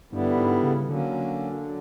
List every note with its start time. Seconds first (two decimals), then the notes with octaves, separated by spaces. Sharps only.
0.12 G2 D3 G3 B3 E4
0.37 G#2
0.63 C#3
0.88 D3 F#3 A#3 C#4
1.64 F#3